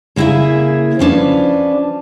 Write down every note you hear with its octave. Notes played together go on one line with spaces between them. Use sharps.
C#3 A#3 E4 G#4 E5
F3 C#4 D4 B4